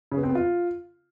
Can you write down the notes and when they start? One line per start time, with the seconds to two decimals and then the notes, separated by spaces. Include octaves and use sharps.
0.12 C#3
0.17 B3
0.23 C4
0.29 B3
0.35 F4